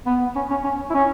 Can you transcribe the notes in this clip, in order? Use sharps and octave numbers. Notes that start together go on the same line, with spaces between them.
B3
C#4
C#4
C#4
E4
C#4